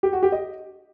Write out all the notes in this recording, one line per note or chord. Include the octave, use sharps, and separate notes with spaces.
G4
F#4
G4
D#5